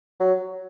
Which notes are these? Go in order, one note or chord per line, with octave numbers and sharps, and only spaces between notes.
F#3